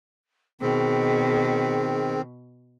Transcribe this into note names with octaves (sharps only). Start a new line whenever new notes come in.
B2 D#3 C4 G#4